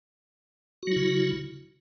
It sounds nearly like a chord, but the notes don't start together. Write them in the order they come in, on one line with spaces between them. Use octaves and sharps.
F#4 F#3 E4 C#3